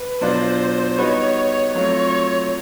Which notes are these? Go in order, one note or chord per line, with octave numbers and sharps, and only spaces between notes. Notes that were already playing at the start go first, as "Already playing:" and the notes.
Already playing: B4
B2 F#3 B3 D4 F4 C5
G3 B3 D#4 F#4 B4 C#5
F#3 A3 C4 F4 C#5